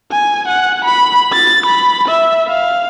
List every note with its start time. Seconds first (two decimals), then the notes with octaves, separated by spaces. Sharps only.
0.11 G#5
0.48 F#5
0.85 B5
1.33 A6
1.66 B5
2.08 E5
2.49 F5